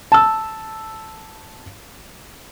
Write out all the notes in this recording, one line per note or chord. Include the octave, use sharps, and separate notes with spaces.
A5 E6